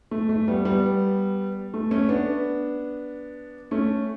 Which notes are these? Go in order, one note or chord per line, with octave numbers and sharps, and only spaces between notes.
A3
A3
G3 B3
G3 B3
A3
A3 C#4
B3 D4
A3 C#4